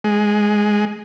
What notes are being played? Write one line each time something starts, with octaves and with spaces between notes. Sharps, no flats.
G#3